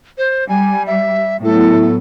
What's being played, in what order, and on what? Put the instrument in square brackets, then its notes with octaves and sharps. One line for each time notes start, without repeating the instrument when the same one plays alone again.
[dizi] C5
[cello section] G3 [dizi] G#5
[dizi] E5
[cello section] A2 F#3 B3 [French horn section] E4 [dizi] A4